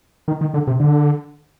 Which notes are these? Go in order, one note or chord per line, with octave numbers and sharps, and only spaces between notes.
D#3
D#3
D3
C3
D3